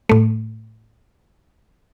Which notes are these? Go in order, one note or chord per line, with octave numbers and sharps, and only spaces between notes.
A2 A3